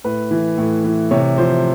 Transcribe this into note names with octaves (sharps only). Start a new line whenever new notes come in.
A2 B4
E3
A2
E3
C3 C#5
F3 C5